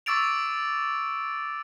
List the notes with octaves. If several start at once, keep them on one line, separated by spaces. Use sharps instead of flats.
C#6 D6 E6 A6 D7 F7